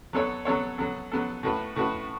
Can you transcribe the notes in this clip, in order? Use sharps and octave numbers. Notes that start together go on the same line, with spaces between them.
F#3 B3 A4 C#5
F#3 B3 A4 C#5
F#3 B3 A4
F#3 B3 A4
A2 A3 F#4 B4
A2 A3 F#4 B4